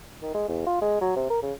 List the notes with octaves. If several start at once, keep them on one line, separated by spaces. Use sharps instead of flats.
D#3
G#3
E2
F4
G#3
F#3
C3
A#4
C#3